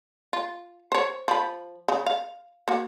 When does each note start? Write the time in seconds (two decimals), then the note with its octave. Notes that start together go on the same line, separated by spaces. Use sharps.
0.33 F4
0.92 C5 C#5
1.28 F3 B5
1.88 C#3
2.06 F5
2.68 A#3 F#4